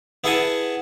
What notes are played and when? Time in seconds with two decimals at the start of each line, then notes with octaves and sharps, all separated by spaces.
0.24 B3 E4 G#4 F#5 G#5 A5